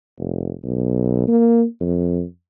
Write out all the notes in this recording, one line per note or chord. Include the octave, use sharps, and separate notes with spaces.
F1
B1
A#3
F2